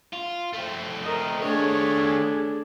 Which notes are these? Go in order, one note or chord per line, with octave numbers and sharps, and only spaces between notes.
F4
A3 C4
A#4 D#5
D#3 A3 D4 G#4 C#5